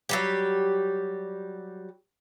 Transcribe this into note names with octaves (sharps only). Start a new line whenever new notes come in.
F#3 G3 G4